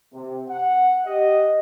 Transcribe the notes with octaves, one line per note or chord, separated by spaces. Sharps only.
C3
F#5
G4 D#5